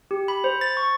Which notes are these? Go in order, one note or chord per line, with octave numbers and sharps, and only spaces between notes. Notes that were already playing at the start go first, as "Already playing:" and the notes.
G4
B5
C5
A6
C#6